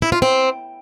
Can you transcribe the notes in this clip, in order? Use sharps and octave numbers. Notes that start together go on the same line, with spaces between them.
E4
F4
C4